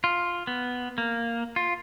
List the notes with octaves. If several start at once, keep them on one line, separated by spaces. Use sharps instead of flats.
F4
B3
A#3
F4